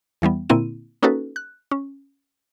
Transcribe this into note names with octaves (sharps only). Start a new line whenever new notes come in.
E2 E3 G3 B3
A#2 D3 A#3 C4 E4 D#7
A#3 C#4 D#4 F#4 A4 B4
F#6
C#4